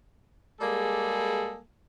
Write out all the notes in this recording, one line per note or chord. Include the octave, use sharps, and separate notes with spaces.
G3 G#3 A#3 G#4 A4